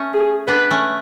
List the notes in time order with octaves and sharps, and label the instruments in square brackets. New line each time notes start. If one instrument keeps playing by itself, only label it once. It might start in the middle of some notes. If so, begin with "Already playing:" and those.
Already playing: [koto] A3 C#4
[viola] G#4
[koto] B3 D4 [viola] B4
[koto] A3 C#4